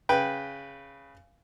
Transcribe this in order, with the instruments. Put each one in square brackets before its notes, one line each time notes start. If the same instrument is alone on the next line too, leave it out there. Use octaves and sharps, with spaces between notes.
[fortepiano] C#3 B4 G5